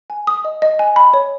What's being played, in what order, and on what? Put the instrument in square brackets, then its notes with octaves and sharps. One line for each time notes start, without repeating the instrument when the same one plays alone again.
[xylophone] G#5
D#6
D#5
D#5
G#5
B5
C#5